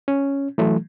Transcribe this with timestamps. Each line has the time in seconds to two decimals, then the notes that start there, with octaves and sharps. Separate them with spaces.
0.08 C#4
0.58 E3 F#3 A3